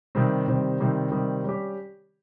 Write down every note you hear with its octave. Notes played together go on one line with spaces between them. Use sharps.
C3 D#3 G3 C4
C3 D#3 G3 C4
C3 D#3 G3 C4
C3 D#3 G3 C4
G3 C#4 G4